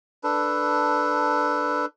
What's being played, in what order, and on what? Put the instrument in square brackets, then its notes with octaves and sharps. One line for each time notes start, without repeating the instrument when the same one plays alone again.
[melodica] D4 A4 B4